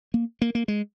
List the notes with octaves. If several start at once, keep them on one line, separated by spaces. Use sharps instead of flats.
A#3
A#3
A#3
G#3